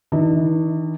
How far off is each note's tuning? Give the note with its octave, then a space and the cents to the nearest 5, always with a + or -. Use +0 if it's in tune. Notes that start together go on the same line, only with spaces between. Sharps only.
E3 -40 D4 +40